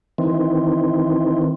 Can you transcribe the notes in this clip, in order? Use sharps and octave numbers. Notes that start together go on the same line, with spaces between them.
D#3 E3 C4